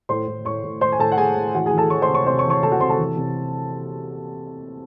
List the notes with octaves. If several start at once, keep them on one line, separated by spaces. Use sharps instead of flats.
A2 C5 C6
A2
A2 C#5 C#6
A2
A2 C5 C6
G#5
A2 A4 A5
F#5
A2 G#4 G#5
A2
E3 F#4 F#5
G#4 G#5
E3
A4 A5
E3 C#5 C#6
C5 C6
C3
C#5 C#6
C3 C5 C6
C#5 C#6
E3
C#5 C#6
E3 A4 A5
F#4 F#5
C3 C5 C6
A4 A5
E3
C3